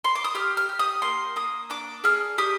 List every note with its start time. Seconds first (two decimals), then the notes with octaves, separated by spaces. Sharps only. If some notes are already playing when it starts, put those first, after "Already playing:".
0.05 C6
0.15 D6
0.24 D#6
0.35 G4 F6
0.57 F6
0.69 G4
0.79 D#6
1.02 A#3 C6
1.36 A#3 D#6
1.70 D4 D6
2.04 G#4 F6
2.38 G4 D#6